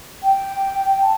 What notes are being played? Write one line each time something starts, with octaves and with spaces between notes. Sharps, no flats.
G5
A5